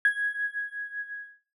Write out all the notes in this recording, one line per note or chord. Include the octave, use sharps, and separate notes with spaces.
G#6